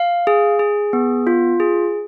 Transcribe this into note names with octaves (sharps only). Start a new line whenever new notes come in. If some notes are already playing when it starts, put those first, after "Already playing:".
Already playing: F5
G#4
G#4
B3
F4
G#4